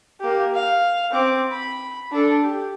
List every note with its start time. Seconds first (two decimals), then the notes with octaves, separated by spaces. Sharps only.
0.21 A#3 G4
0.54 F5
1.11 C4 D6
1.51 B5
2.12 D4 A4
2.44 G4